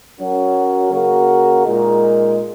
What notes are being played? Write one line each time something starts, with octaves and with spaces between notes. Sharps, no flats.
F#3 C#4 F#4 A#4
C#3 A#3 F#4 A#4
A#2 G#3 D#4 A#4